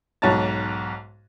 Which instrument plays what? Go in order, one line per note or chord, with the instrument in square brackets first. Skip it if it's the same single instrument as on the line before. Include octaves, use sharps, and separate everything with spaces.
[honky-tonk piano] B1 G#2 C#5 A5 A6